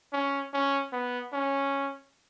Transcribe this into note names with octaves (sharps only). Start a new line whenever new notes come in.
C#4
C#4
B3
C#4